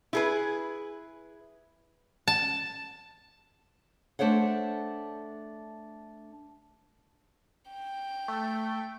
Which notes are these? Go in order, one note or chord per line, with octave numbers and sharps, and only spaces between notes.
E4 G#4 B4
A5
A3 D4 C5 C#5 F#5
G5
A3